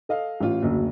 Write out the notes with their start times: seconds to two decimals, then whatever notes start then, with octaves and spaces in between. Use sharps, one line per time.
0.09 A4 D#5 F5
0.41 A1 F4
0.63 F#1 D2